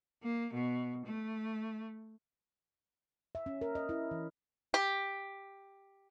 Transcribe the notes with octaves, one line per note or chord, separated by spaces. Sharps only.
A#3
B2
A3
E5
C#4
A#4
D#5
E4
E3
G4